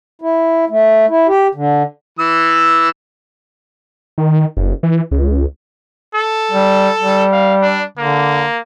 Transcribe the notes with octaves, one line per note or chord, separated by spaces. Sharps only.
E4
A3
E4
G4
D3
E3 E6
D#3
F#1
E3
C#2
A4
G3
G3
F5
D4
D3 A#3